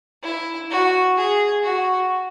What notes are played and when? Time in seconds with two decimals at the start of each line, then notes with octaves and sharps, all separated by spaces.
0.23 E4
0.70 F#4
1.17 G#4
1.63 F#4